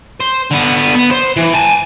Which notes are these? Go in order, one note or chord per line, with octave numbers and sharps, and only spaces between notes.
C5
D3 B3
B3
C5
E3
G#5 A5